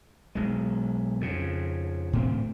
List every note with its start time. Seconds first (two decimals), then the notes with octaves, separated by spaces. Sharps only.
0.35 B1 G#3
1.21 F2 C#3
2.13 A2 B3 C4